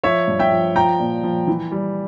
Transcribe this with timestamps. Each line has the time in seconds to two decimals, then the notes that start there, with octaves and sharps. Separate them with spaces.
0.03 F3 C#5 E5
0.28 G2
0.39 E5 G5
0.52 F3
0.75 F3 G5 A#5
1.00 A#2
1.23 F3
1.47 E3
1.72 G3